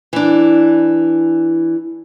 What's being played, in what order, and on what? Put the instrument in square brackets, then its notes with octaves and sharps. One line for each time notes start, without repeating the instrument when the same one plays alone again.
[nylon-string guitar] E3 D4